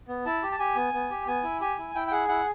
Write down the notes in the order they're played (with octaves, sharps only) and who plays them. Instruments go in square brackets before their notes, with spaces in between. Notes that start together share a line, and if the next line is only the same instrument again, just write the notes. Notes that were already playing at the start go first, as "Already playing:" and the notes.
[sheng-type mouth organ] B3
E4 A5
G4
A5
G4 G#5
B3
B3
G4
B3 G#5
E4
G4 G#5
E4
E4 G5
G5
G#4 F#5
E4 F#5